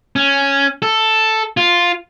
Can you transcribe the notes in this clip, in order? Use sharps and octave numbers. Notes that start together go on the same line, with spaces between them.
C#4
A4
F4